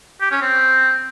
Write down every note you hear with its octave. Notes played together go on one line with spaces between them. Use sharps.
G4
C#4
C4